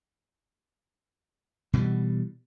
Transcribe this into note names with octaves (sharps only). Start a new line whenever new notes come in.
B2 E3 F#3 G3